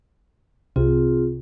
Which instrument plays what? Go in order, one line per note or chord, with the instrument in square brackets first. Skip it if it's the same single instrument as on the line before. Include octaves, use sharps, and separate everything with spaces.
[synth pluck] C2 C3 [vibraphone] C4 F4 G#4